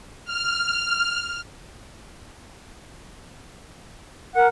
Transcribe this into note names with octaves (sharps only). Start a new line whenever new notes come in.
F6
A#4 F#5